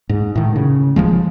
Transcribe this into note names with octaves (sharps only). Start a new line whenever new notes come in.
G#2
A2 D#3
C#3
D#1 E2 F3 G#3